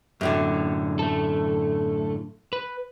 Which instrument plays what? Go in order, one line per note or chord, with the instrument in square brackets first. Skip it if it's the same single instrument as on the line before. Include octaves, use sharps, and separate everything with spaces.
[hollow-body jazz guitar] F#2 A2 D3
[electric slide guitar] A3 A4
B4